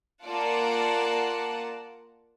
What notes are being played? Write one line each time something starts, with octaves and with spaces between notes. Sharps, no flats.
A#3 F4 D5 F#5 A5